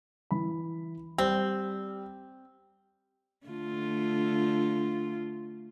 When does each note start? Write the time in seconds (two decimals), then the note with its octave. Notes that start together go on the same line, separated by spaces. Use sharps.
0.31 E3 B5
1.18 G3 C4
3.47 D3 A3 F4